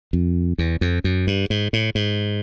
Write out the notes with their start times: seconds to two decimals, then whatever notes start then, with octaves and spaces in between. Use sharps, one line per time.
0.13 F2
0.58 E2
0.81 F2
1.04 F#2
1.27 G2
1.50 G#2
1.73 A2
1.95 G#2